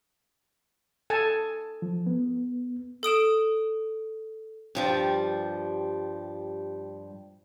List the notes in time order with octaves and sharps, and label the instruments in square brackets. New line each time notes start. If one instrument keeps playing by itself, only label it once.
[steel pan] A4 G#5 A5
[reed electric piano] F3
B3
[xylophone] A4 D#6 D7 E7
[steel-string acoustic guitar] G2 F3 G3